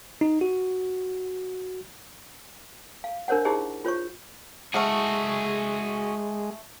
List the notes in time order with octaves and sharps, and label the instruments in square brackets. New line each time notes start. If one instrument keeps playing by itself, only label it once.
[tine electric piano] D#4
F#4
[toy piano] F5
D4 A#4 C5 C#5 F#5
D#4 E4 G4 G#4 C5 D#5
F4 C5 C#5 C#6
[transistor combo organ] G#3 [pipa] A3 F5 F#5 [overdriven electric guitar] F#4 G#4